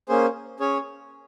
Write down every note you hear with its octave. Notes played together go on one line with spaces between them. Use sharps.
A#3 C#4 G#4 C5
C#4 G#4 C#5